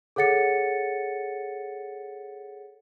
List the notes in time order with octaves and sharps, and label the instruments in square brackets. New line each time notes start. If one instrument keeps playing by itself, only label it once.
[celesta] G#4 A4 C#5 F#5 A6 C#7